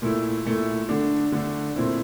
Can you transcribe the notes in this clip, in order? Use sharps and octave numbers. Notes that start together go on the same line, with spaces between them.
A#2 A3 E4
A#2 A3 E4
D3 A3 D4
D3 A3 D4
A#2 A3 C4 E4